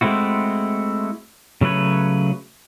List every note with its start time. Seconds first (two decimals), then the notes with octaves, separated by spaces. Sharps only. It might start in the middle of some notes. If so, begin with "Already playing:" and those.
0.01 G#3 A3 C4 E4 F#4
1.61 C#3 F#3 A3 B4 C#5